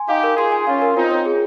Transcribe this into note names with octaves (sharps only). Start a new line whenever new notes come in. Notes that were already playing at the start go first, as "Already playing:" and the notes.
Already playing: G#5 C6
D#4 G4 F5
A#4
F4 G#4 C6
G#5
C#4 F4 F5
A#4
C4 D#4 F4
C#5
G#4